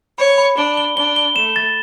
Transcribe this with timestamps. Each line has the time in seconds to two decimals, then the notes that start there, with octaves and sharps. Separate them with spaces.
0.18 C#5 B5
0.38 B5
0.57 D4 G7
0.77 G7
0.97 D4 G7
1.16 G7
1.36 A3 E7
1.56 A6